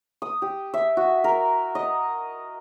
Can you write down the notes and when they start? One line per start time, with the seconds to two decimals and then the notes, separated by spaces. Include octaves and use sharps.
0.22 D#6
0.42 G4
0.74 E5
0.97 F#4
1.24 A#4
1.75 D#5